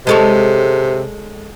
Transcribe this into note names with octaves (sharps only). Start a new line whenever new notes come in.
C3 G#3 A4 C#5